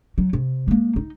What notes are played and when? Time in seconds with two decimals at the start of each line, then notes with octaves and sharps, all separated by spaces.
0.18 F#3
0.33 C3
0.68 G#3 A#3
0.96 D#4